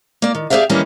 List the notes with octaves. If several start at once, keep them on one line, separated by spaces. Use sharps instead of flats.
A#3 D5
D#3
G4 G#4 C5 D5 E5 F5
D#3 E3 G3 A#3 C#4